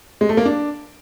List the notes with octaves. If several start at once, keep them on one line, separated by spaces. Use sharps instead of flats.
G#3
A3
A#3
D4